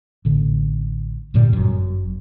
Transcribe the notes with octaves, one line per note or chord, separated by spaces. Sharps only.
A1 D3
G2 A#2 D3 G3
G1 F#2